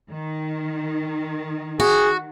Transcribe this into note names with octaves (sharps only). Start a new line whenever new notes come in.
D#3
F#4 G#4